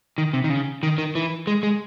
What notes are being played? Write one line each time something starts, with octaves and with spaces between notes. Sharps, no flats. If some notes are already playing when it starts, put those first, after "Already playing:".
D#3
C3
D#3
C#3
D#3
D#3
E3
G#3
G#3